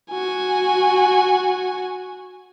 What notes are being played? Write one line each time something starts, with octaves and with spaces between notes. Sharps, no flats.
F#4 G#5